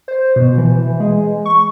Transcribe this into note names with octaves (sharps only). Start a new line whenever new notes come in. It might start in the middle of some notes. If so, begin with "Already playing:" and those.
C5
B2
E3
G#3
C#6